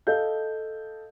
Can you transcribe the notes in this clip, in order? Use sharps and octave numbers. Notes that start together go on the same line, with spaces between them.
A4 D#5 F5 G6